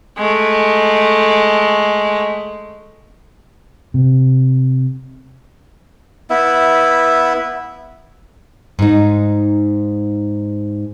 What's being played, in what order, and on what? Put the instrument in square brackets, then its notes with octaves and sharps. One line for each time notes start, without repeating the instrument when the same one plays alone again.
[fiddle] G#3 A3
[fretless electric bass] C3
[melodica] B3 E4 E5
[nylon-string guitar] G#2 D#4